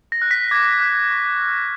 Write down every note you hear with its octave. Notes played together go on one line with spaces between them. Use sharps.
A#6
F#6
B6
D6 G#6
F#6
C#6
F6